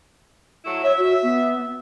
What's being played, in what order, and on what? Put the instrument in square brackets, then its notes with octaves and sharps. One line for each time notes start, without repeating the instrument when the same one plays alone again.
[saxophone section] F#3 A3 E4
[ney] C#5 [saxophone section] E5
[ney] F#4
B3